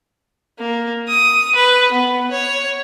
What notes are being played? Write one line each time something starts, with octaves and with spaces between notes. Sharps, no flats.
A#3
D#6
B4
B3
C#5